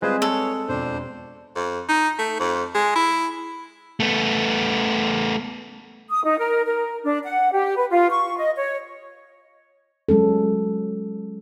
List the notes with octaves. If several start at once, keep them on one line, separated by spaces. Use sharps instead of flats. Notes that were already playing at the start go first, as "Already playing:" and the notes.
G3 G#3 C4 F4 G#4 B4 C5
A4 C#5
E1 F2 D4 C5
F2
D#4
A3
F2
G#3
E4
A3 B3
D#6
D#4
A#4
A#4
D4
F#5
G4
B4
F4
C#6
D#5
C#5
F#3 G#3 C#4 A4